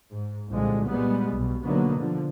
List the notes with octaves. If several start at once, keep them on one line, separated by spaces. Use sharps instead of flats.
G#2
C2 A#2 D3 F3 G#3
A#2 G3 G#3 B3
B1 B2
B2 D3 D#3 F#3 A#3 B3
D3 F3